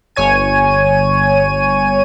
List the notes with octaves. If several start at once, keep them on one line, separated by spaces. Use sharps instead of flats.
G1 C#5 G#5 D#7